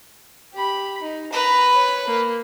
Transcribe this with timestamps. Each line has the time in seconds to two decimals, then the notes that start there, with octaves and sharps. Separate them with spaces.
0.54 G4 B5
1.02 D#4
1.33 B4 A#5 B5
1.75 C#5 B5
2.06 A#3